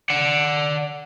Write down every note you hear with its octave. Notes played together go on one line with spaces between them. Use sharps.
D5 F#5